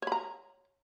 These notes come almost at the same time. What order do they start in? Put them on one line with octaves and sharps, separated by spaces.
C#5 B5 A#5